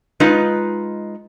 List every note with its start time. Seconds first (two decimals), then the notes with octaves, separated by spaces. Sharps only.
0.20 G#3 D#4 F4 B4